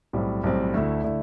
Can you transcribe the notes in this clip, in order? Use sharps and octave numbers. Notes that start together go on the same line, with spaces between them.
B1 A2 G3 C4
B1 A2 G3 C4
D2 D3 A3 E4
D3 A3 E4